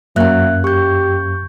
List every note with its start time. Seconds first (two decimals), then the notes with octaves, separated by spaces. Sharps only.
0.16 F#2 F#3 A#3 C#4 E5 F#6
0.64 G4 C#6 G6